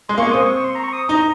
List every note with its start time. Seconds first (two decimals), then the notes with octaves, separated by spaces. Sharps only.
0.08 G#3 C6
0.18 A#3 C#6
0.26 G#3
0.32 C4 D#6
0.43 C#6
0.54 C#6
0.64 C6
0.75 A#5
0.84 C#6
0.93 D#6
1.09 D#4 A#5